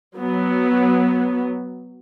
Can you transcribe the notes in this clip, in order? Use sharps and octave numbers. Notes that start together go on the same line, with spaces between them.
F#3 B3